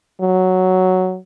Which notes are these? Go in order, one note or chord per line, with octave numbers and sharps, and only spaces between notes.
F#3